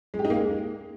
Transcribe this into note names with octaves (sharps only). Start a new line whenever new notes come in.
G#3
G4
D#4
A#3
G#3